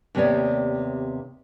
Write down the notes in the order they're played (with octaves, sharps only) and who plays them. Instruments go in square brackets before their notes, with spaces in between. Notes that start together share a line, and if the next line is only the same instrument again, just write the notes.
[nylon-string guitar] D#2 C3 B3 C#5 D5